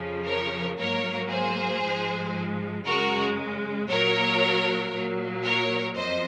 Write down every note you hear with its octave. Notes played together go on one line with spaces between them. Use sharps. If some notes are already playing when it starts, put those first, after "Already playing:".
Already playing: F2 C#3 F3
A#4 C#5
G#2 F#3 A#3 A#4 C#5
G#4 C5
G#2 F3 G#3
F#2 C#3 G#3 F#4 A#4
A#2 F#3 A#3 A#4 C#5
A#2 F#3 A#3
A#4 C#5
F2 C5 D#5